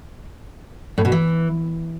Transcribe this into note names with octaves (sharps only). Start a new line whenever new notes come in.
A2
B2
E3